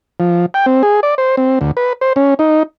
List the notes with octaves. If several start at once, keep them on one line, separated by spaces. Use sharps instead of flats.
F3
G5
C4
G#4
D5
C5
C4
D2
B4
C5
C#4
D#4